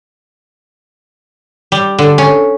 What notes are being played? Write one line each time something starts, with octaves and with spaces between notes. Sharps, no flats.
G3
D3
C#4